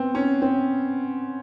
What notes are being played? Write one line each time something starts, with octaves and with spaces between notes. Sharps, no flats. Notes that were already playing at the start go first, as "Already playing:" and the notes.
Already playing: B3 C4
C#4
C4